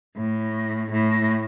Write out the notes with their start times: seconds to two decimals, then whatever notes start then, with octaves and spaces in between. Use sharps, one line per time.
0.17 A2
0.92 A2